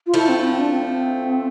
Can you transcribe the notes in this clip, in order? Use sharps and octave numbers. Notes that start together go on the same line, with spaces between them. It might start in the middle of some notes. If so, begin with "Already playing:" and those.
F4
F3 A3 E4
C4
C4
D4
C4